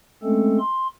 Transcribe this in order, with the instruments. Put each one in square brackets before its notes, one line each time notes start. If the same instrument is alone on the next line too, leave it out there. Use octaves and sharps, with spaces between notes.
[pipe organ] G#3 A3 C4 C#4 A4
C6